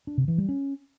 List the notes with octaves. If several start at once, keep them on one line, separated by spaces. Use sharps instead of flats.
D4
C3
E3
G3
C#4